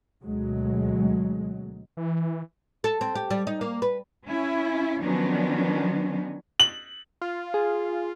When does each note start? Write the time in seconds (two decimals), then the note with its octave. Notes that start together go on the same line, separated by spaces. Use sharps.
0.24 D2 B2 F#3 G#3
1.97 E3
2.84 A4
3.01 C4
3.15 G4
3.31 G3
3.47 D#4
3.61 A#3
3.82 B4
4.27 C#4 E4
4.99 D#3 F3 F#3 B3 C#4 D4
6.60 F#7
7.21 F4
7.54 G#4